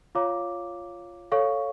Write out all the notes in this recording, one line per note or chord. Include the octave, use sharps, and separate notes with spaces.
F4 C#5 F5 A#5 D6
A4 C#5 F5 C#6